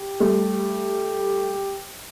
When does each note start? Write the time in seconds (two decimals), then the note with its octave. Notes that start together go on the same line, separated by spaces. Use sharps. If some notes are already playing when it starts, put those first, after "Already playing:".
Already playing: G4
0.20 G3 A3